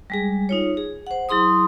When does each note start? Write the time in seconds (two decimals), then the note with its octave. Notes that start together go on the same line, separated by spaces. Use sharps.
0.10 G3 G#3 G#4
0.49 D#4 F4 C#5
0.77 G#4
1.07 C5 F#5
1.29 F#3 E4 G#4 C6 D#6